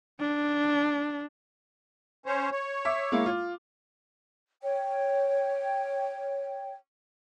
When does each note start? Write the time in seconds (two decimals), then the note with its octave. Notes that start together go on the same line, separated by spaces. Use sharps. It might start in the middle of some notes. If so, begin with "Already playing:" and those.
0.20 D4
2.26 C#4 C5 C#5
2.52 C#5
2.85 E5 D6
3.12 G#3 A#3 E4
3.26 F4
4.62 C#5 G5